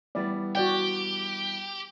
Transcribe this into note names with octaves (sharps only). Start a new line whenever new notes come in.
E3 G3 B3 D5
F#4 G4 D5 G5